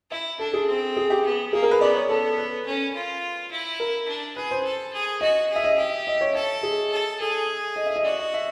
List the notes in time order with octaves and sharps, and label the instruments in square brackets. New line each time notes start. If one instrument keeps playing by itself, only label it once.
[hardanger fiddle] E4 [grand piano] E5
[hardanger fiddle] D4 [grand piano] A4
[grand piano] G#4
[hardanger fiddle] C4
[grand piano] G#4
G4
[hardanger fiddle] B3
[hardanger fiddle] A#3 [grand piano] G#4
[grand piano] A#4
B4
[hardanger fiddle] B3 [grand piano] D5
[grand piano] C#5
[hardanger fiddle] B3 [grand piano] A4
[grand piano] B4
[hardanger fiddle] C#4
F4
E4
[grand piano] A#4
[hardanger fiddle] D4
[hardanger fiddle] G#4 [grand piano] B4
[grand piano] C5
[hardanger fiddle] A4
G#4
[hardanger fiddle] F#4 [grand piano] D#5
[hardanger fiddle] G#4
[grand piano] E5
D#5
[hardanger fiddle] G4 [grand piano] E5
[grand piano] D#5
C#5
[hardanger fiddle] A4 [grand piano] C#5
[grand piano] G#4
[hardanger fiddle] A4
[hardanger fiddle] G#4 [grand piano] A4
[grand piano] D#5
E5
D#5
[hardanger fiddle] F#4 [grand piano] D5
[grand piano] D#5
E5